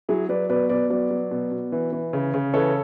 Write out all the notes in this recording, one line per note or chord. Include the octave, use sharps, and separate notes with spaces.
F#3 E4 G#4
F#3 B4 D5
B2 B4 D5
B2 B4 D5
F#3 B4 D5
F#3
B2
B2
E3
E3
C#3
C#3
E3 A4 C#5